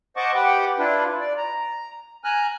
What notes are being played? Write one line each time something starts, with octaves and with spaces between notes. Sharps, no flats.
C5 D#5 F#5 A5 C#6 D6
G4 B4 F#5 G5 D6
D4 E4 F4 B4
D5
A#5
G#5 A#5 F6 F#6